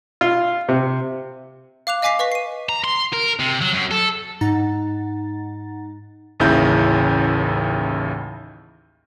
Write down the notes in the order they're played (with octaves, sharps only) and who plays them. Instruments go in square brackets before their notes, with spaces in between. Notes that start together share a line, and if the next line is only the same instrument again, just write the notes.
[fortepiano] F4
C3
[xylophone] F5 D6 F#6 F7
D#5 F5 G#5 D6 B6 C7
B4 D#5 C#6 B6
C7 D#7
[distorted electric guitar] A#5
C6
A#4
C3
F#3
F#2
A4
[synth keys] G#2 D#4 F#5 A#5 A6
[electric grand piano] A1 D#2 C#3 E4 G6